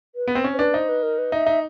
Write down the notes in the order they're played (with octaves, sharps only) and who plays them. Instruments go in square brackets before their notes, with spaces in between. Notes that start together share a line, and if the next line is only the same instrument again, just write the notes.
[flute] B4
[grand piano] B3
C4
C#4
[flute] C5
[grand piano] D4 [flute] B4
[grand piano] D#4 [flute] C5
[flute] B4
A#4
B4
[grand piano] D#4 [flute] E5
[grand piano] D#4